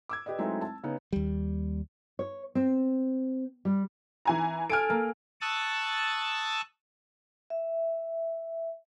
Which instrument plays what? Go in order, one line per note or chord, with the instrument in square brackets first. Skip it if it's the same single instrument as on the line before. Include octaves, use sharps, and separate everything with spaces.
[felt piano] D6 E6 G#6
G4 B4 D5 D#5
F#3 G#3 A3 C4 D#4 E4
A5
C#3 B3 D#4
[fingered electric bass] D#2 G3
[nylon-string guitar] C#5
C4
G3
[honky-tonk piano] E3 G#5 A#5
[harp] A4 G#5 [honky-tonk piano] F6 D7
[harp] A#3
[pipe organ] A5 C#6 D#6 E6 F#6 A6
[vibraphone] E5